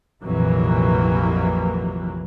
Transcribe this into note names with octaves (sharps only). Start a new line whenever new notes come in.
A#1 F2 C3 E3 F#3 A#3